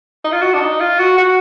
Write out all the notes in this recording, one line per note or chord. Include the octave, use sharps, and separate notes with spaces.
D#4
F4
F#4
D4
D#4
F4
F#4
F#4